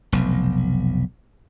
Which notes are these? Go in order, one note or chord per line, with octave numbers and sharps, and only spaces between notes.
F1 B1